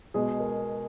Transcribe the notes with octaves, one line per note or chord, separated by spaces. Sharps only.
B2 G#3 G#4
A#4